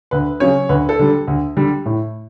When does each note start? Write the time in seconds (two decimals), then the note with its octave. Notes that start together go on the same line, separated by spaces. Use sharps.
0.11 D2 B4
0.40 C#3 F#3 C#5
0.69 D2 B4
0.89 A4
0.99 D3 G3
1.27 D2
1.57 D3 G3
1.86 A2